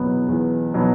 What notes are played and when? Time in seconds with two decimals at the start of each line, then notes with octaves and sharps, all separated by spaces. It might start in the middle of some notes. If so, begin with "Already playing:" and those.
Already playing: E2 B2 F#3 B3
0.28 E2
0.74 B2 F#3 B3